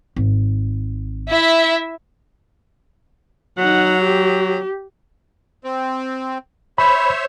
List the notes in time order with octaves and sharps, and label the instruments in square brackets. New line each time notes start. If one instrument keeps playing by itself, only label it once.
[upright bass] G#1
[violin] E4 E5
[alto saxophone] F#3 [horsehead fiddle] D#4 F#5
[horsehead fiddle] G4
[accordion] C4
[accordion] C5 C#5 E5 [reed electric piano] B5